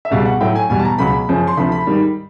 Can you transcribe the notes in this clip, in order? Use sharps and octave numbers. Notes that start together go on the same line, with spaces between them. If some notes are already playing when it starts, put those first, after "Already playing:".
E5
C#2 B2 G3 F5
F#5
A2 F#3 G5
G#5
E2 B2 G3 G#5
A5
A#5
C#2 B2 F#3 B5
F#2 C#3 F3
C6
D2 C3 F3 B5
B5
G#2 D#3 G3